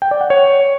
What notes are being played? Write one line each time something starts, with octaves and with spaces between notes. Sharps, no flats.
G5
D5
F#5
C#5